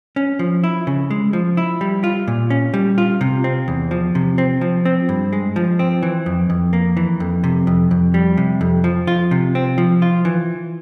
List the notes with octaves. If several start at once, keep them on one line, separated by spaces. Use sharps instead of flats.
C#4
F3
E4
C#3
G#3
F3
E4
G3
F4
A#2
C#4
G3
F4
C3
C4
E2
F3
C3
C4
F3
C4
G2
G#3
F3
C4
E3
F2
F2
A#3
E3
F2
C3
F2
F2
G3
C3
F2
F3
F4
C3
C4
F3
F4
E3